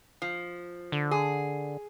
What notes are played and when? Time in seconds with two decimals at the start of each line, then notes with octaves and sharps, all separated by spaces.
0.22 F3
0.92 D3
1.11 G#4